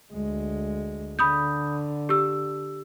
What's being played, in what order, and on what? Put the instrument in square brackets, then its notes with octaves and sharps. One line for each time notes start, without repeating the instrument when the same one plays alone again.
[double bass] D2 G#3
[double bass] D3 [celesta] B5 D#6 G6
[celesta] G4 E6